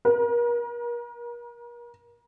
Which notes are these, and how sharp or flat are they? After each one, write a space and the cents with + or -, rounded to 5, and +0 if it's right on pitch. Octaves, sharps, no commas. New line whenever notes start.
A#4 +35